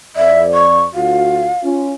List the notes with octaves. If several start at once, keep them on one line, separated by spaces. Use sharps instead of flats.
F2 D5 E5
C#6
D2 F4 F#4 F5
C#4 F4